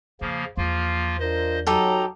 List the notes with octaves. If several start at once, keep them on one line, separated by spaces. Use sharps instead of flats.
E2 C#3 F3 A#3
E2 F3 A#3 F4
D4 F4 A#4 C5 D#5
F#3 D#4 G4 A4 A#5